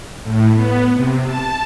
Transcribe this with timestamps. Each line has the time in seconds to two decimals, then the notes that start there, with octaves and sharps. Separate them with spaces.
0.24 A2
0.54 B3
0.95 C3
1.26 A5